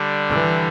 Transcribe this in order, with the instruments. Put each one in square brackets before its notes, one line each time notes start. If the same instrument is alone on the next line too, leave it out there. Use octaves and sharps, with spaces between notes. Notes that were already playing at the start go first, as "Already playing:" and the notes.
Already playing: [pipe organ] D3 G3 D4
[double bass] E3